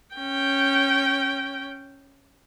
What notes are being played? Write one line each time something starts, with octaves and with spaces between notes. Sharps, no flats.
C#4 G5